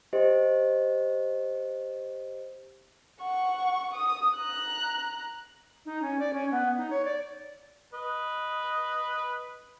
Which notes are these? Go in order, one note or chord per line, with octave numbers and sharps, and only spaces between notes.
G4 C5 D#5
F#5 C#6
D#6
A#5 F#6
D#4
C#4
D5
C#4
B3
D#4
C#5
D5
B4 D#5